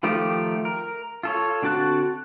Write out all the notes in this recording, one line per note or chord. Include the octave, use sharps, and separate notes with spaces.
D#3 F3 A3 F4 G4
A#4
F4 A4 C#5
D3 C4 F#4 A5 F#6